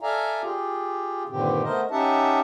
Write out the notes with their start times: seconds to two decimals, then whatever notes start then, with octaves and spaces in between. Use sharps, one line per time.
0.01 A4 D5 E5 F5 G#5 A#5
0.42 F4 G4 G#4
1.29 G2 A#2 D3 D#3 C4 G4
1.63 A3 B3 A#4 C5 D#5
1.91 C#4 D#4 G4 E5 F#5 A5